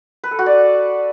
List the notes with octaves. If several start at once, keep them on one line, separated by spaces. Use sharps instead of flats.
B4
A4
F#4
D5